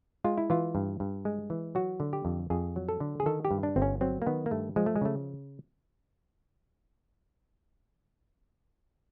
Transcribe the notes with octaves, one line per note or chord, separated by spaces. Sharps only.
G#3 F4
E4
E3 F4
G2
G2
G#3
E3
F#3 F#4
D3
G4
F2
F2 G#4
F#3
A4
D3
G#4
D#3 A4
G4
G2
D4
G1 C4
C#4
F#3 C4
A#3
D#3 B3
A#3
G2 A3
F3 G#3
A3
G#3
C#3 A3